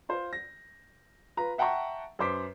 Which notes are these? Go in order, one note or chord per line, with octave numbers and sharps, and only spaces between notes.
F4 C5
A#6
F4 B4 A#5
E5 F#5 G5 A5 A#5 C#6
F#2 B4 C5 D6 B6